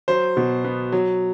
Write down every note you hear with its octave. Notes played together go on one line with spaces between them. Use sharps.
F#3 C5
B2
B3
F#3